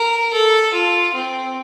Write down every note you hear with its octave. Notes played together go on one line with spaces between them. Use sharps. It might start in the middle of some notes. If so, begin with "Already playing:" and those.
Already playing: A#4
A4
F4
C4